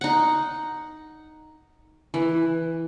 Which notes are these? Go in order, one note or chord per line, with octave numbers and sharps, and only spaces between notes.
D#4 F#5
E3